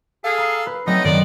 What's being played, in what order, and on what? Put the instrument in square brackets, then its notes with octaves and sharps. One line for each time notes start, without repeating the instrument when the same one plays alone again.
[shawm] G#4 [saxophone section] A4 F5
[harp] A#5
B4
[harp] F#3 A3 C4 [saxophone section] B3 D#5 [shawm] D#4
[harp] F#2 D#3 C4 [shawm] D5